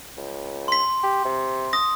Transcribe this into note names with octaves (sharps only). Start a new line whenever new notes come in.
C#2
C6 B6
G4
C3
D#6 A#6